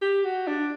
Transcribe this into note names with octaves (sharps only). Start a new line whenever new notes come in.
G4
F#4
D4